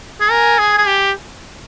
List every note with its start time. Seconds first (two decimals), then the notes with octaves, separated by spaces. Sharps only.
0.20 G#4
0.30 A#4 G#5
0.58 G#4
0.78 G#4
0.87 G4